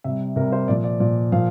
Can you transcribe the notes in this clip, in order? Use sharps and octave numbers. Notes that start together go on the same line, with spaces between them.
C3 G3 E5
C3 G3 A#4
C5
A#2 F3 D5
D5
A#2 F3 D5
A#2 F3 F5